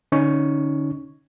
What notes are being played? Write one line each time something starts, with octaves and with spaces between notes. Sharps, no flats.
D3 C#4 D#4 C#6